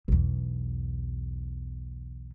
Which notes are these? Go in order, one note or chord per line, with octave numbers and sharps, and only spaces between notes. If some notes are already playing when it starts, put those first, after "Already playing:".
B1 E2